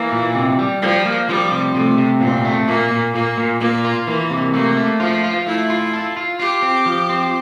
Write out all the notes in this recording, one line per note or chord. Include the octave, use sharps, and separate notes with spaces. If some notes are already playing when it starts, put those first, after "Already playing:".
Already playing: E3 A#3
A#2
C3
G3
F3 G3
A#3
F3 G3
C3
C3 A3
C3
A#2 C4
A3
A#2 A#3
A#2
A#2 A#3
A#2
A#2 A#3
F4
E3 A#3
C3
A3 A#3
A3
F3 F4
F4
A3 E4
F4
A4
F4
F4 G4
C4
F3
C4